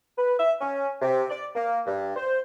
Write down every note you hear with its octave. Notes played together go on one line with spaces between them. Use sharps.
B4
E5
C#4
C3
D5
A#3
G2
C5